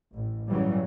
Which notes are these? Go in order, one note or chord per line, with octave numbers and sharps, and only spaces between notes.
A1
G2 C#3 E3 F#3 G3